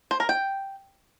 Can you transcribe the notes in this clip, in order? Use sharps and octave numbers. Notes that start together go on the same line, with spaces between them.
C5
A#4
G5